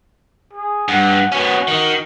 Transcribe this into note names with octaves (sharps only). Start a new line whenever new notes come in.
G#4
G2 F#5
B3 C#4 F#4
D#3